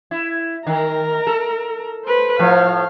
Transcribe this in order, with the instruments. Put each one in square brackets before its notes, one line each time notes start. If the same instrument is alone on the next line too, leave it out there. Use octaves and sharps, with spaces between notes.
[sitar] E4
[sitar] D#3 [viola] A#4 A#5
[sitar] A4
[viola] B4 C5
[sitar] A2 F3 [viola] F5